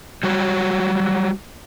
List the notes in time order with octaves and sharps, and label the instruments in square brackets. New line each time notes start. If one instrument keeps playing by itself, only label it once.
[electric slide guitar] F#3 G3 F#4 C#5